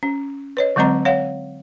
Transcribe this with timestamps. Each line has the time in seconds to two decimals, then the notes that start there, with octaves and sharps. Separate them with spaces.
0.03 C#4
0.57 B4 C#5 D#5
0.76 D3 F#3 G#3 C4 D#5 A#5
1.05 C#5 F5 F#5